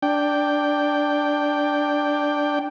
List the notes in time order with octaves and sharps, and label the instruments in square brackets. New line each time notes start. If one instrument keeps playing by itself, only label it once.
[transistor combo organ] D4 G5